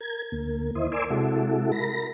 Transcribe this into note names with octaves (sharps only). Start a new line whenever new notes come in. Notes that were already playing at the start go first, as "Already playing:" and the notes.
A#4 G#6
D2 A#3
D#2 E4 C5 D#5
A#4 D5 G#5 C6 D6 E6
C3 G#3 E4 F#4 A4
A#4 B5 A#6